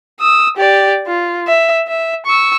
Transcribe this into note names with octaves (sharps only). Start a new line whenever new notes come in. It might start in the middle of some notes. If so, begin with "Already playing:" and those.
D#6 E6
G4 D5
F4
E5
E5
C#6 E6